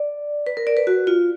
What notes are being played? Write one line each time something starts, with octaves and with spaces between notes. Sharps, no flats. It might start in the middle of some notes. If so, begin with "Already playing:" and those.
Already playing: D5
B4
A#4
D5
B4
F#4
F4